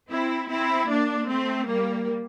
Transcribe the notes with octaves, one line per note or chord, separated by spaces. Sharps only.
C4 E4
C4 E4
A#3 D4
A3 C4
G3 A#3